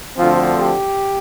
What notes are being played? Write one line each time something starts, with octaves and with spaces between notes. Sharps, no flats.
D2 D3 F3 C4 F4
G4